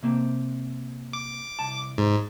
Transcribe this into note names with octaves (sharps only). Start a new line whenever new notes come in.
C3 A#3 C4
D6
C2 A5
G#2